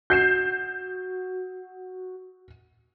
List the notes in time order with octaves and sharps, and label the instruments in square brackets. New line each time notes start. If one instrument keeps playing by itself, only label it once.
[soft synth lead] F#4 [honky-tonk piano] G6 C7 E7